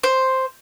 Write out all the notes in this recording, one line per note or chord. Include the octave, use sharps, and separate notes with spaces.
C5